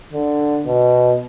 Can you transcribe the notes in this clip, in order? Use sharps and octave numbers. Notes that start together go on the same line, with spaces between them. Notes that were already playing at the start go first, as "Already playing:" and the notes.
D3
B2